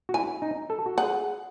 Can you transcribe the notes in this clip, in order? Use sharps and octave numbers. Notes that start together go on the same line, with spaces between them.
F#4
E4 G#5
D#4
A4
F#4
G#4 F#5